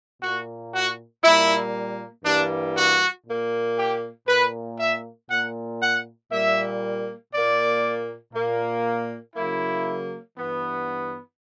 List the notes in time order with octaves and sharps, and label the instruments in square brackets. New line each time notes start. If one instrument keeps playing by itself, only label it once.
[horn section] A#2 A#3 F#4
F#4
A#2 G3 A#3 E4
G2 E3 G3 A#3 D4
F#4
A#2 A#3
G4
A#2 A#3 B4
E5
A#2 A#3 F#5
F#5
A#2 G3 A#3 E5
A#2 A#3 D5
A#2 A#3
C#3 F#3 A#3 E4
G2 E3 B3